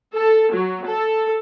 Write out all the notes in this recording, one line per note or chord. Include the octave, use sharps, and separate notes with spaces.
A4
F#3
A4